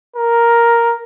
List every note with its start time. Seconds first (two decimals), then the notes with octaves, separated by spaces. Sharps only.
0.16 A#4